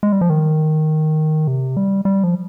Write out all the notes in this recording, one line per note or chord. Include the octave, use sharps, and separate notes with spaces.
G#3
G3
F3
D#3
C3
G3
G3
F3